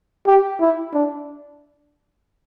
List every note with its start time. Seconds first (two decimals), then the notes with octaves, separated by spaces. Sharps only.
0.27 G4
0.60 E4
0.94 D4